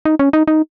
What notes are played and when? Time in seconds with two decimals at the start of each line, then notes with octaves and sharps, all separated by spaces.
0.05 D#4
0.19 C#4
0.33 D#4
0.48 D#4